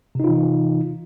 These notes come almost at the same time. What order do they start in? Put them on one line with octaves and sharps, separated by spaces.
C3 D#4 F4 E3